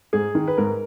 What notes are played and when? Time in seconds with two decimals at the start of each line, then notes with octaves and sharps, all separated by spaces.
0.13 G#2 G#4
0.35 D#3
0.47 B4
0.58 G#2 A#4